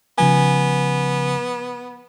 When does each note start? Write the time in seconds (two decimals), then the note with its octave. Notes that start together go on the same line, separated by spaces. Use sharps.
0.18 C#3 F3 B3 G#5